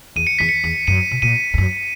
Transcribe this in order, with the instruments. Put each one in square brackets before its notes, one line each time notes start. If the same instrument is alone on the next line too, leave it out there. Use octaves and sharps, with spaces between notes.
[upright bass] E2 [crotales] D#7
[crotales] C#7
[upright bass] E2 [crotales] B6
[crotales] C#7
[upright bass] E2
[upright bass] F#2 [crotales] D#7
[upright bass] B2
[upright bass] A#2 [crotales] D#7
[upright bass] E2
F#2